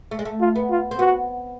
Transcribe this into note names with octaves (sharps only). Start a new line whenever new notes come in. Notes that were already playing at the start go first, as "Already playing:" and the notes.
A3
G#3
A3
F4
B3
F4
C4
B3 F#4